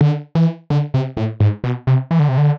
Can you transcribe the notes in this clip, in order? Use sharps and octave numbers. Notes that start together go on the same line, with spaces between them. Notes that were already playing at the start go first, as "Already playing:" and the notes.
D3
E3
D3
C3
A2
G#2
B2
C3
E3
D3
C3
D3